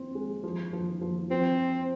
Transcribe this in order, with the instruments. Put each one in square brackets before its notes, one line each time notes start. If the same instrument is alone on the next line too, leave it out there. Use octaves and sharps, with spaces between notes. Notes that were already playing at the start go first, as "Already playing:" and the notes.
Already playing: [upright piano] C4
G#3
F3
F3
F3
[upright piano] F3 [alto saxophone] C4